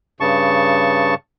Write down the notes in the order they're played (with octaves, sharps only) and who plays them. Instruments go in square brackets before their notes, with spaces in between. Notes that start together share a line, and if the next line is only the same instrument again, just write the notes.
[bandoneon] G2 C#3 A5 C#6